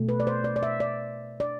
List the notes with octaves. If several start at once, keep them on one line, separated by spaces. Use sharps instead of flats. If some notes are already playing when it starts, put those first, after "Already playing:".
Already playing: B2 A3
B4
D5
C5
D5
D5
E5
D5
D5